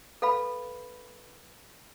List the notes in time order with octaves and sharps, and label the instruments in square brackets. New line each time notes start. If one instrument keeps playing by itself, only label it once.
[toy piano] A4 B4 F5 B5